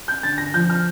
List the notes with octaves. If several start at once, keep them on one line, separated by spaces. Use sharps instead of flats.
G6
D3 A6
A#6
F3 G6
F6